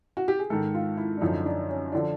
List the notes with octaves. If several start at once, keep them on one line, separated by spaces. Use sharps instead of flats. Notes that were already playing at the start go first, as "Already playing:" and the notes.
F#4
G4
G#4
G#2 D#3 A4
F4
E4
D4
F#2 D3 F3 D#4
D4
C#4
D3 F3 D4